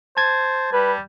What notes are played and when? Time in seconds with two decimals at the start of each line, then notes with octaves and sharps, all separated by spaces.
0.17 C5 A5 G#6 A6
0.73 G3 B4